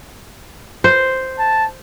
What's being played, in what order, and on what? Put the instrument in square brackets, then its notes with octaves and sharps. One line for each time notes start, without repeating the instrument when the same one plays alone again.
[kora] C5
[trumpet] A5